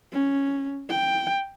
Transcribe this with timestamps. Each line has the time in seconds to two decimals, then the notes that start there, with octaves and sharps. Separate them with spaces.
0.12 C#4
0.89 G5